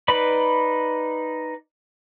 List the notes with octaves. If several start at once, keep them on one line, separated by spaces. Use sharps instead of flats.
D#4 B4 D5 B5